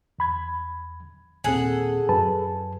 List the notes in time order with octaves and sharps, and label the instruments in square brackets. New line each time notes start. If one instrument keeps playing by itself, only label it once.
[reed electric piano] E2 B5 G#6
[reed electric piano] D#2 A#2 C4 [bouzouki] G#4 A4 F#5
[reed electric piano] F#2 B4 A5